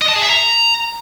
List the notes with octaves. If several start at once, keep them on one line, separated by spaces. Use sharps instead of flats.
D#5
A5
G#4
E5
A#5